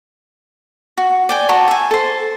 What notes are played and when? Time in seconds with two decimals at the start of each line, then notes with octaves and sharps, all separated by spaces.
0.98 F#4
1.29 D5 G5 G#5
1.49 F#4 A5 A#5 C#6
1.68 E5 G#5
1.91 A4 C5